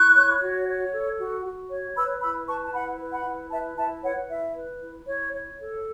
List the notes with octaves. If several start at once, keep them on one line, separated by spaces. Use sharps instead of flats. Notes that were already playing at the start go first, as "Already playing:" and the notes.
Already playing: E4 C#6 F#6
C#5
F#4
C#5
A4
F#4
F#4
C#5
B4 B5 E6
E4 B5 E6
B4 A5 C#6
A5
E4 F#5 B5
B4
F#5 B5
E4
B4 E5 A5
E4 E5 A5
B4 C#5 F#5
E4 E5
B4
E4
E4 C#5
C#5
A4